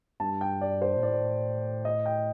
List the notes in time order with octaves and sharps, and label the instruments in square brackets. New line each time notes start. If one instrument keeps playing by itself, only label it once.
[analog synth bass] G2 [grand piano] A5
[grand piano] G5
D5
C5
[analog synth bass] A#2
[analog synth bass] A2 [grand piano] D5
[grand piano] D#5
G5